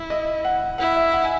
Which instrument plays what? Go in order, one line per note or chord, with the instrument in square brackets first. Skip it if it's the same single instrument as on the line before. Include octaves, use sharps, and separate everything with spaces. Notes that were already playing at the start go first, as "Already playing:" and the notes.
Already playing: [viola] E4
[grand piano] D#5
F#5
[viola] E4 [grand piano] F#5
[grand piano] E5
F#5
G#5